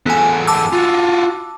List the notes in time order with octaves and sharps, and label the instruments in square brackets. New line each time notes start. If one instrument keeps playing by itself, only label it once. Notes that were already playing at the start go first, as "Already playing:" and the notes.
[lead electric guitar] E2 A4 [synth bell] B3 G#5
[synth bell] A5 D6 E6
[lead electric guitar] F4 F#4